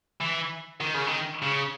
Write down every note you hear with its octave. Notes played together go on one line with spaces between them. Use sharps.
E3
D#3
C#3
D#3
C#3